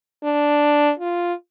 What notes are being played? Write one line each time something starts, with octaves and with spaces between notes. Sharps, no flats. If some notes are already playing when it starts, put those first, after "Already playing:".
D4
F4